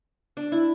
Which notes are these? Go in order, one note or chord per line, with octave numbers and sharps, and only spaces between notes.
D4
E4